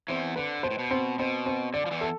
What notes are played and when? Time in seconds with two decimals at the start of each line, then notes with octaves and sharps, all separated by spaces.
0.08 E2 E3 C4
0.36 D3 B4
0.63 B2 C5
0.71 A2
0.79 B2
0.91 C4
1.19 B2 C4
1.46 C4
1.74 D3 D5
1.86 F3
1.91 E2 E3
2.01 A4